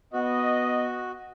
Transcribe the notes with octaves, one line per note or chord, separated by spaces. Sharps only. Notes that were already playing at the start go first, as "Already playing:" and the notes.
B3 F#4 D#5